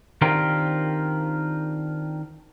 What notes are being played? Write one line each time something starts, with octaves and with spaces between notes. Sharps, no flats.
D#3 C4 D4 F4 G4 A#4